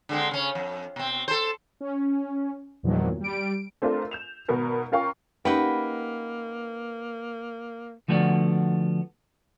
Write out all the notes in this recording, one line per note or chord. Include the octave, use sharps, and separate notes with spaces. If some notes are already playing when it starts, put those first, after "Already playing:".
D3 G#3 C4
C#3 C#4
F2
B2 C4
A4 C5
C#4
E2 G2 A#2 D#3 F3 F#3
G3 D7
A3 C4 D4 F4 A#4
G6 E7 F7
G#1 B2 A#4 B4
C#4 F4 A#4 F5 G5 C#6
A#3 C#4 D#4 G4 B4 D#5 F#5 G5
D3 F3 A3 B3 D4 F#4